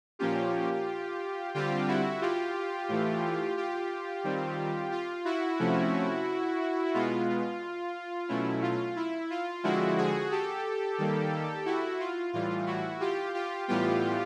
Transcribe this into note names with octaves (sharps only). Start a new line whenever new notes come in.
A#2 F3 A#3 C#4 F4 G4
D3 G3 C4 F4 G4
E4 F#4
F4 G4
A2 E3 A3
F4 G4
D#3 G3 C4
F4
E4 F#4
C3 F3 A3 C#4
B2 G#3 B3 F4
B2 F#3 A3 C#4 E4
F4
E4
F4
D3 F3 G#3 C4 E4 F#4
F#4 G#4
G4 A4
D#3 G3 A#3
E4 F#4
F4
A2 E3 G3 F4
E4 F#4
F4 G4
F4 G4
A2 E3 G3 B3 F4 G4